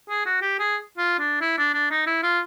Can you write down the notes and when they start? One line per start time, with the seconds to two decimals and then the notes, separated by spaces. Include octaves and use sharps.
0.09 G#4
0.26 F#4
0.42 G4
0.60 G#4
0.98 F4
1.19 D4
1.41 E4
1.58 D4
1.74 D4
1.91 D#4
2.07 E4
2.23 F4